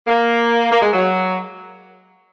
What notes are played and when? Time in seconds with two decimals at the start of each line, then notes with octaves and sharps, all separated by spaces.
0.07 A#3
0.71 A#3
0.82 G#3
0.93 F#3